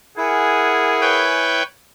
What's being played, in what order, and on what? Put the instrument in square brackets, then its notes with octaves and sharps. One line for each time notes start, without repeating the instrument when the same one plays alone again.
[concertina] E4 [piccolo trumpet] G#4 [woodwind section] A#4 F#5 G#5
[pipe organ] B4 C#5 G5